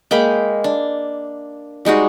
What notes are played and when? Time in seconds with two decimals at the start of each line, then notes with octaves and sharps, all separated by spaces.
0.11 G#3 A#3 G5 B5
0.64 D4
1.85 G3 G#3 D#4 F#4